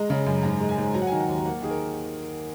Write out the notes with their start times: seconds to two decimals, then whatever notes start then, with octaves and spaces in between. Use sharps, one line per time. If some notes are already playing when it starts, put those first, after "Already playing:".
Already playing: G#3 A#5
0.10 C#3
0.26 F#2
0.43 G#2 A#5
0.60 G#3
0.69 G#5
0.78 G#2
0.94 F#3 A#5
1.02 F#5
1.07 D#3 G#5
1.20 F#5
1.28 D#2
1.46 A#3 F#5
1.62 D#3 G#4
1.71 A#4